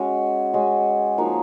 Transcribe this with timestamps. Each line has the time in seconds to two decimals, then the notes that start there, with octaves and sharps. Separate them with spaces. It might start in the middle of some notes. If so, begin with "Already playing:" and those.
Already playing: G#3 C#4 F#4
0.54 G#3 C#4 F#4
1.18 F3 A#3 D#4 F#4